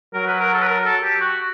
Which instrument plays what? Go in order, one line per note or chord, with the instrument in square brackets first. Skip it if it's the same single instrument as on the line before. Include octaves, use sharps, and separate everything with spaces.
[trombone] F#3 [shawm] A#4
[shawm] B4
A#4
A4
B4
A#4
A4
G4
F#4